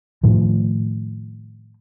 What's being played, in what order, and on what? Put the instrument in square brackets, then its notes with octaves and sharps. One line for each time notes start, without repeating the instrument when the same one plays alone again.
[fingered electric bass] A2 D#3 F3